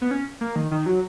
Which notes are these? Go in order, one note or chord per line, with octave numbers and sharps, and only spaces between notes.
B3
C#4
A#3
D#3
D#3
F#3